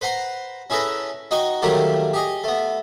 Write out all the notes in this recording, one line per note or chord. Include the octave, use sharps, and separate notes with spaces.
B4 C5 F#5 A#5 C6
C#4 E4 G#4 A4 B4 A#5
D#4 F#4 D#5 G5 C#6
D#3 F#3 G3 A3 A#3 G4
G4 G#4 D#5
A3 B3